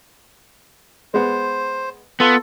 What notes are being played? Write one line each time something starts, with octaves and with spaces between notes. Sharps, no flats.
G#3 B3 C5
B3 F4 A4